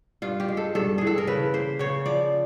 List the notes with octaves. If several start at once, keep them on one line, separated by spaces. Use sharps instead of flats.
G2 F4
G4
G#3
A4
G2 A4
E3 G#4
A4
A#4
C#3 B4
A#3 C5
C#3 C#5
F3 D5